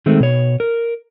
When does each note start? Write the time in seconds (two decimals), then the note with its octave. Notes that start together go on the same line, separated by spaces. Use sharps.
0.06 D#3 G#3 A3 C4
0.20 B2 C#5
0.60 A#4